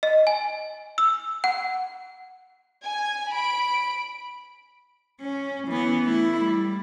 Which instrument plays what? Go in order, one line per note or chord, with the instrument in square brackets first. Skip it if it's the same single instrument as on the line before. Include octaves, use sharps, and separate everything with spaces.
[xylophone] D#5
G#5
E6
F#5
[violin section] G#5
B5 D7
[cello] C#4
E3 B3
A3 E4
G3